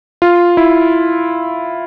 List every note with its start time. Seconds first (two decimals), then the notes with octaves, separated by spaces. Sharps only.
0.22 F4
0.57 E4